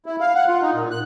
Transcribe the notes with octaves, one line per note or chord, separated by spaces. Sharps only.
E4
F5
F#5
F4
D#4
A#2
F#6